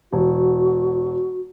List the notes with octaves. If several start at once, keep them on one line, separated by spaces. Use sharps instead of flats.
E1 F#4